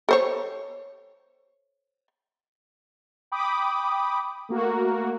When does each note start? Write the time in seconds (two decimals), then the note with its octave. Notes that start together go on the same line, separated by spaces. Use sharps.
0.09 A4 C5 C#5
3.32 G5 B5 D6 D#6
4.49 A3 A#3 F#4 A#4